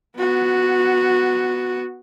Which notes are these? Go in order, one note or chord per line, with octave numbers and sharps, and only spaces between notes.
B3 F#4